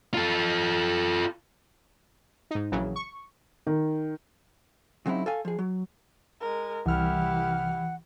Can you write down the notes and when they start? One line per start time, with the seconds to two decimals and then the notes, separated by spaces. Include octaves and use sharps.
0.14 F4 A4
2.51 G#2 D#4
2.72 A#1 C#3 E3 F#3
2.96 C#6
3.67 D#3
5.06 C#3 F#3 C4 D#4 E4
5.26 A4 F5 G#5
5.45 F3 G#4
5.59 F#3
6.41 G#3 A#4
6.86 C2 E3 E4 G4 F#5 F6